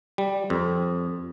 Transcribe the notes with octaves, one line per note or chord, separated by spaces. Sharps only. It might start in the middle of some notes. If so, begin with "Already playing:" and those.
G3
F2